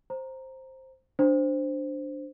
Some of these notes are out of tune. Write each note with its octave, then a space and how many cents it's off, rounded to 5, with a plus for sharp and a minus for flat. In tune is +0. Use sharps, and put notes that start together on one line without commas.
C5 +5 A#5 +0
D4 +0 C5 -5